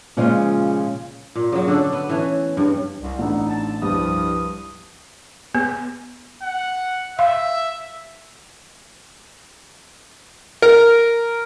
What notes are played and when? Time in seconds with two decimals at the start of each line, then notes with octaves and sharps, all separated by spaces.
0.17 A#2 C#3 F3 G#3 C#4 F4
1.35 A#2
1.52 C#3 F#3
1.68 D3 D4 A4
1.93 B3
2.09 E3 A3 C#4
2.57 G2 C#3
3.01 C2
3.19 A1 B3 D4 D#4 A4
3.49 A5
3.82 C2 G2 F3 D#6
5.55 B3
6.43 F#5
7.19 E5 F5
10.62 A#4